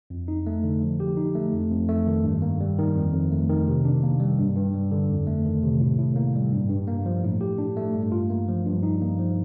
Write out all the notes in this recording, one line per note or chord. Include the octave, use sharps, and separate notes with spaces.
F2
D#4
A3
D3
F3
G4
D#4
A3
F2
F2
A3
D#3
G2
A#3
G3
D#3
F2
F2
A3
D#3
C3
D4
A#3
G3
G2
G2
G3
D3
F2
A3
D#3
C3
A2
A2
A#3
G3
G2
G2
A#3
F3
A2
G4
D4
A3
G2
F4
A#3
F3
G2
D#4
A#3
F3